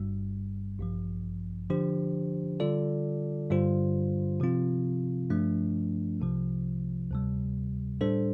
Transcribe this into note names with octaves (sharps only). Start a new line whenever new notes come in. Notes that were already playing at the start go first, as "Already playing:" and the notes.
Already playing: G1 G2 G3
A1 G2 F3
D3 F3 D4 G4 C5
D3 G3 F4 A4 D5
G2 D3 G3 F4 C5
C3 F3 C4 F4
G2 F3 A3 D4
C2 C3 F3
D2 C3 G3
A2 G3 D4 A4 C5